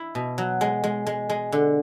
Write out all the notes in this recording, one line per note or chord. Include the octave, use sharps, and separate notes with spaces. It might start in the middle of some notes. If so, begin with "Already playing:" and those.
Already playing: E4
B2
F#3
G#3
G#3
G#3
G#3
D3